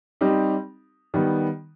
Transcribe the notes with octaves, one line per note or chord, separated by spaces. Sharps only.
G3 C4 D#4 G4
D#3 G3 B3